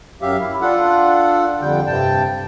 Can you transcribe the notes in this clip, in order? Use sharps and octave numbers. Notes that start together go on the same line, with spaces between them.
F#2 F#3 G4 E5 F5
E4
D4 F4 A4 F#5
F2 D3 G3 G5
G2 C3 G5 A5